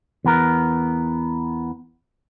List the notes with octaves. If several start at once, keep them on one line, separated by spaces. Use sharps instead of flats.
E2 B3 A#4